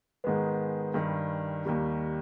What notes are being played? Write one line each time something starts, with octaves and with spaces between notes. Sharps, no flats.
G#2 D#3 G#3 B3
G2 D#3 G3
D#2 D#3 G3